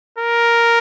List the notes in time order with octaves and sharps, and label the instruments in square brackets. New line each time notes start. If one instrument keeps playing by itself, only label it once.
[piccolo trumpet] A#4